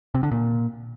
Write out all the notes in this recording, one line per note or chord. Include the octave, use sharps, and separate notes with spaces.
C3
D3
A#2